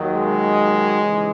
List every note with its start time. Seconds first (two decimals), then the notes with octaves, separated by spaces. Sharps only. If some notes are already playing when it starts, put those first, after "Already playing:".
Already playing: D#2 D#3 F#3
0.14 G#3
0.99 D#2 C#3 E3